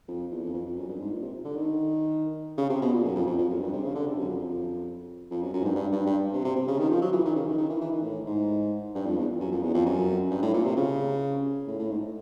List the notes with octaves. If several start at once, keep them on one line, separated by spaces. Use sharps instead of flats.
F2
E2
F2
F2
F2
F#2
G2
G#2
A#2
C3
D3
D#3
C#3
C3
B2
A#2
F#2
F2
F2
F2
F#2
G2
C3
C#3
D3
C3
F#2
F2
F2
F#2
F#2
G#2
G2
G2
G2
G2
C3
C3
C3
C#3
D#3
F3
F#3
E3
D#3
C#3
D#3
D#3
E3
E3
D#3
A2
G#2
G2
F2
E2
F#2
F2
E2
F2
F#2
G2
A2
A#2
C3
C#3
A2
A2
G#2